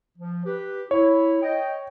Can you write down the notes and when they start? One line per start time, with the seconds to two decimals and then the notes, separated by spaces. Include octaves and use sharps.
0.17 F3
0.46 G4 B4
0.91 E4 C#5
1.42 D#5 G5